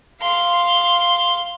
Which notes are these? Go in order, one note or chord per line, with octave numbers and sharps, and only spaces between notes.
F5 C6